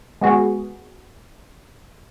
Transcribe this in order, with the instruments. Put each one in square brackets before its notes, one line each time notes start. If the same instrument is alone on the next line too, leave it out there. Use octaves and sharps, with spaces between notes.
[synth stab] G#3 B3 F#4 G#4